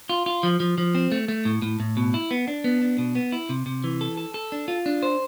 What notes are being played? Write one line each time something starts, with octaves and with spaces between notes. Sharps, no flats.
F4
F4
F3
F3
F3
C4
A3
A3
A2
A2
A2
B2
E4
B3
D4
B3
D4
B2
B3
E4
C3
C3
E3
A4
A4
A4
D4
F4
D4
C5